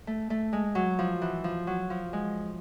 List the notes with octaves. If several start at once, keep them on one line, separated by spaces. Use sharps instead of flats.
A3
A3
G#3
F#3
F3
E3
F3
F#3
F3
G#3